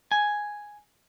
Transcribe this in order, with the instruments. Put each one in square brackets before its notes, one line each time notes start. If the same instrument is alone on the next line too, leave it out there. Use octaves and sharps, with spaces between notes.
[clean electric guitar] G#5